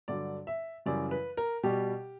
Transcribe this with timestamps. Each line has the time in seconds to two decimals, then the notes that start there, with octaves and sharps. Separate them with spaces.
0.08 G2 D3 F#3 D5
0.47 E5
0.86 F#2 C#3 E3 G3 D5
1.11 B4
1.37 A#4
1.63 B2 G3 G4